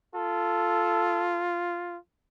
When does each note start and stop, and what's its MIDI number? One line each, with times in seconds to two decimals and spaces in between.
0.15 1.97 65
0.15 1.47 69